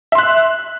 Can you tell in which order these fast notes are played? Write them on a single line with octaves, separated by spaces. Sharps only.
E5 C6 F#6